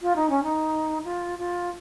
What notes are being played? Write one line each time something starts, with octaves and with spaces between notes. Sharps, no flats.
F4
D#4
C#4
D#4
F4
F4